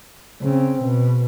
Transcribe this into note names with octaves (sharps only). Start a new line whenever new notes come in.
C#3 C4
B2